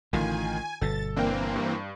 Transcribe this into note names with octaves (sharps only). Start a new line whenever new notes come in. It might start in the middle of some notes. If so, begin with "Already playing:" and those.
A1 A2 D3 D#3 F4 G#5
G1 B2 A4 A6
E3 A#3 C4 D4 A#4 G5
G2